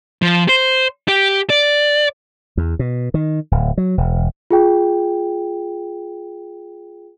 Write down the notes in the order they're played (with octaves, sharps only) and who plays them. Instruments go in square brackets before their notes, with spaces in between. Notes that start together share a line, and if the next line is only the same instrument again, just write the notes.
[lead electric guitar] F3
C5
G4
D5
[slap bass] E2
B2
D#3
D1
F#3
E1
[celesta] F4 G#4 G5